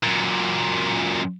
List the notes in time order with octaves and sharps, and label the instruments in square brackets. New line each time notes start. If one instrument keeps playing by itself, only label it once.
[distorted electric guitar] F#2 A#2